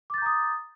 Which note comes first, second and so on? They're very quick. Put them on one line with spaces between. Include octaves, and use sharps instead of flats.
D6 A6 G6 A#5 D#6